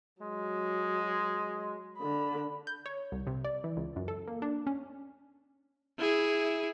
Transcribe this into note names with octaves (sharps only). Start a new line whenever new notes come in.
F#3 G#3
D3 B5
G6
C#5
C2
C3
D5
E3
C#2
F#2
A4
A#3
D4
C#4
E4 G#4